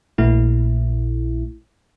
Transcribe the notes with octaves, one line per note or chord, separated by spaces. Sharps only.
A#1 A#2 A3 E4